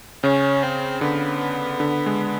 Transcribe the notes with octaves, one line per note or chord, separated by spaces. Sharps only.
C#3 C#4
C4
D3 B3
D3
G#3